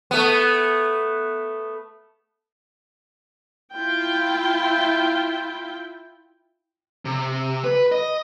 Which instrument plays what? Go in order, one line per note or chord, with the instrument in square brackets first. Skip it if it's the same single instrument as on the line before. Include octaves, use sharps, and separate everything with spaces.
[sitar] A3 B3
[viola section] E4 F4 G5
[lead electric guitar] C3
B4
D#5